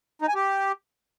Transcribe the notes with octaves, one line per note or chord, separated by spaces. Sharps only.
D#4
G#5
G4